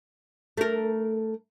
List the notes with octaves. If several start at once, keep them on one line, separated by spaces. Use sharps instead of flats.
A3 A#4